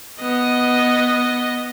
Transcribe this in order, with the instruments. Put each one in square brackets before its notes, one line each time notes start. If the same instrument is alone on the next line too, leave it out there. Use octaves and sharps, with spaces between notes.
[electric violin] B3 D#5